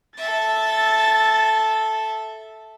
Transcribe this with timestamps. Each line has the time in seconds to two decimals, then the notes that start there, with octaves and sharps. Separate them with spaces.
0.17 A4 E5 A6